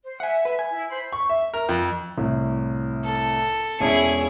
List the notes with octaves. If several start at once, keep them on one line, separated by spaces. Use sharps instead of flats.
C5
E5 F#5 G#5
B4
G#5
E4
C5 B5
C#6
E5
A#4
F2
C2 A2
A4
E1 C#4 E4 G#4 C#7